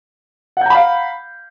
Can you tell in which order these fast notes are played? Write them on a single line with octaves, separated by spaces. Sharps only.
F#5 G6 A#5 B5 F5